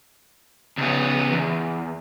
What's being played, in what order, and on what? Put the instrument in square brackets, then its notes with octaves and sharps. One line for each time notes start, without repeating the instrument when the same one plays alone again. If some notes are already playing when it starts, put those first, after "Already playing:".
[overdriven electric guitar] C#2 B3
E2